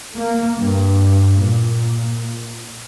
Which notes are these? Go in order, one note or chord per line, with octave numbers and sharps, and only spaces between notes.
A#3
G2
A#2